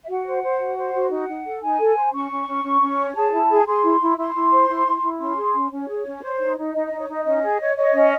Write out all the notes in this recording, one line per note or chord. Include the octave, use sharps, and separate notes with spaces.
E5
F#4 F#5
C5
C5
F#4
C5
F#4
D#4 F#5
D#4
A4
D#4 G#5
A4
C5
C#4 C#6
C#4
C#4
C#4
C#4
C#5
G#4 A5
E4
G#4
G#4 C6
E4
E4
E4 C6
E4
C5
E4
E4
E4
C#4 C6
G#4
C#4
C#4 C#5
G#4
C#4
C5
D#4
D#4
D#4 D#5
D#4 D#5
C#5
D#4 D#5
C#4 D#5
G#4
C#5
C#5 D#5
C#4